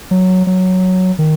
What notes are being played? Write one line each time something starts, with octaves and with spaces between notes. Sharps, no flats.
F#3
F#3
D#3